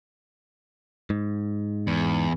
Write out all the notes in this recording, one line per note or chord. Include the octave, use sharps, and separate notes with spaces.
G#2
E2